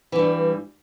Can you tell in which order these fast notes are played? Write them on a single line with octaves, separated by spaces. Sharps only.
E3 G2 G3